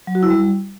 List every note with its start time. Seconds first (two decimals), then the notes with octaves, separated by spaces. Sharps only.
0.07 F#3
0.15 F#4
0.23 E4
0.30 G3